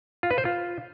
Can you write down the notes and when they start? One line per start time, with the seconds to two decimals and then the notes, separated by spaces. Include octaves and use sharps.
0.23 F4
0.31 B4
0.38 C5
0.45 F4